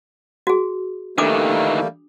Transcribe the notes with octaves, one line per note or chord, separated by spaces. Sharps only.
F#4 G#4
D#3 E3 G3 A3 A#3 D4 D6 D#6